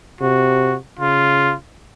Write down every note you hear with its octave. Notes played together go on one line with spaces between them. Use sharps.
C3 F#4
C#3 F4